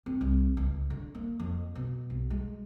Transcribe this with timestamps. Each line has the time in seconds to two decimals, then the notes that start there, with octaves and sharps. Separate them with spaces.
0.06 C4
0.21 C2
0.57 C#2
0.90 D3
1.15 A#3
1.40 F2
1.75 B2
2.10 B1
2.30 G#3